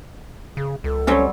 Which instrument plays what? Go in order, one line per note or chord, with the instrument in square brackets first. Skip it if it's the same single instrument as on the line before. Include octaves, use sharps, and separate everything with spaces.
[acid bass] C#3 [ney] G#4
[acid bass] C#2 [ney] A4
[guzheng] F#3 G3 C4 [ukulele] C#4 C#5